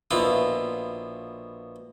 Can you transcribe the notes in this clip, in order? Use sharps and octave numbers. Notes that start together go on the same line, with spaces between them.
A#1 B2 E4 F4